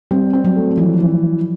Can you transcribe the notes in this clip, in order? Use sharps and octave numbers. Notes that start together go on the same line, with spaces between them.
G3 C4
C4
F#3
A3
E3 F3
E3